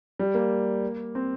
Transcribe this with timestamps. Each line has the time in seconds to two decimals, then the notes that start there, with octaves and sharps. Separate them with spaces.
0.19 G3
0.34 A#3
1.15 C4